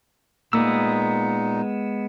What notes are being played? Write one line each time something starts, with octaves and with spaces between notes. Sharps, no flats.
A#2 G#3 A#3 B3 D#4 E6